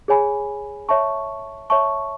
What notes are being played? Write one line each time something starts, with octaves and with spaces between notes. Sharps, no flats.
G#4 C#5 G#5 B5
C#5 E5 A5 C#6
C#5 E5 A5 C#6